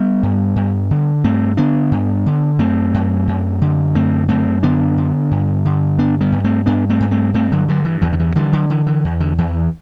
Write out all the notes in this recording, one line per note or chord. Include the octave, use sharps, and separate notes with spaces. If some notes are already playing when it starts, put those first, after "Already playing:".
Already playing: G3 B3
G2
G2
D3
G2 A3 C4
D3 B3 D4
G2
D3
F#2 A3 C4
F#2
F#2
D3
F#2 A3 C4
F#2 A3 C4
D3 B3 D4
D3
G2
D3
G2 B3 D4
G3 B3
G2
A3 C4
G2 B3 D4
A3 C4
G2
A3 C4
G2 A3 C4
D3 F#3
G2 D3 F#3
E3
E2 E3
D3
E3
D3 E3 G3
D3 F#3
D3 E3
E3
E2
D3
E2 E3